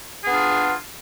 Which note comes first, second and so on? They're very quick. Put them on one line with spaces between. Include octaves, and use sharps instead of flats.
G#4 B3 D4 F4